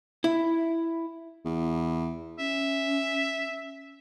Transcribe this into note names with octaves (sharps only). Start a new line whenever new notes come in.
E4
E2
C#4 E5